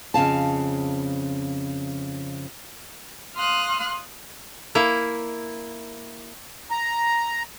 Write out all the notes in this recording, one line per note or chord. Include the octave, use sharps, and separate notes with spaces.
F2 C#3 F5 A5
F5 C6 D#6 F6 F#6
A#3 E4
A#5